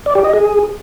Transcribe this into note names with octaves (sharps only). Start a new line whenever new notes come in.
D5
G4
D#5
G#4